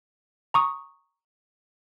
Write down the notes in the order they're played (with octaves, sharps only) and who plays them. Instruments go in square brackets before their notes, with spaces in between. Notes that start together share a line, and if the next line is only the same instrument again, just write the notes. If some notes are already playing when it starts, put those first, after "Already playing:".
[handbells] A#5 C#6 D#6